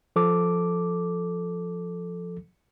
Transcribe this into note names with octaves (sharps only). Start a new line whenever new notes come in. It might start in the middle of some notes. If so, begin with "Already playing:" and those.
F3 A4 D6